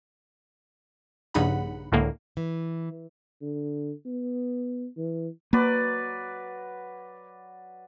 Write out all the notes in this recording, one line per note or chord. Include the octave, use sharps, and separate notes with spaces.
A#1 G2 C#3 D#4 F#5 B5
C#2 A2 D3 A#3
E3
D3
B3
E3
F#3 A#3 B4 D5